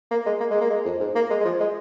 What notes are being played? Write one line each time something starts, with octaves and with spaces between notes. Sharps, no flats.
A#3
G#3
A#3
G#3
A#3
G#3
F2
G#2
A#3
G#3
G#3
F3
G#3